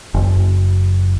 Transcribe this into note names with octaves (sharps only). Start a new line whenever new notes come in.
F#1